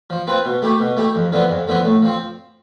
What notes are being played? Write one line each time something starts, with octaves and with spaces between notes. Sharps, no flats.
F3
C4 F4 B4
B2
A3 E4 G4
B2
A3 E4 G4
F2
D3 F3 B3 E4
F2
D3 F3 B3 E4
A2
F3 C4